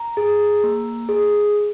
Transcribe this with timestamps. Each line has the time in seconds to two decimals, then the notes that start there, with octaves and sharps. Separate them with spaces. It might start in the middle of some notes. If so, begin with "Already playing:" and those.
Already playing: A#5
0.17 G#4
0.64 A#3
1.09 G#4